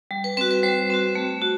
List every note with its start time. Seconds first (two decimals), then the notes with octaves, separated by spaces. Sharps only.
0.11 G3
0.24 B4
0.37 C4 F#4 B4
0.51 B4
0.63 G3 C5
0.90 C4 F#4
1.15 A3
1.42 F#4